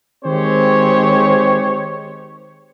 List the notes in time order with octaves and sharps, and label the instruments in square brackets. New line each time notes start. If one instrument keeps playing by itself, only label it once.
[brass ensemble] D#3 G#3 C4 G4 C5 C#5